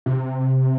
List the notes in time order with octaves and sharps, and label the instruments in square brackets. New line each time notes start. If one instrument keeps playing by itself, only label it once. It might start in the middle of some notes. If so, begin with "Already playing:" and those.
[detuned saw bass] C3